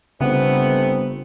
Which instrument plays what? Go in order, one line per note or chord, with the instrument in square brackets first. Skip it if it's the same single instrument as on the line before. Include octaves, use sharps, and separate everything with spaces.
[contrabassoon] G1 [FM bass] C#3 [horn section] A3 B3 [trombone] C4